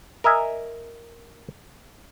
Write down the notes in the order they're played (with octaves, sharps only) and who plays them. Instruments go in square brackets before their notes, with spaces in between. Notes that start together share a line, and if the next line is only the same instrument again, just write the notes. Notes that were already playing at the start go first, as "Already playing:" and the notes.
[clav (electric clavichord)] A#4 D#5 E5 G#5